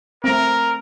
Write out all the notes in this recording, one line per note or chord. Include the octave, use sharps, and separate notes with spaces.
A3 C4 A#4